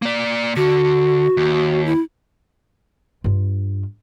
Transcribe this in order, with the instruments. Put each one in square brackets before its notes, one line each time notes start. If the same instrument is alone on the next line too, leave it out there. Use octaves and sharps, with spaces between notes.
[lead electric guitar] A#3 D5
[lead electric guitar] D3 [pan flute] F#4
[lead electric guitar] D#2
[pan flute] E4
[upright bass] G2 F4